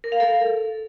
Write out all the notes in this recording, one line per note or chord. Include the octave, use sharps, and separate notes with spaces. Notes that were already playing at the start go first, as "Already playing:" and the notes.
A#4
F5
A4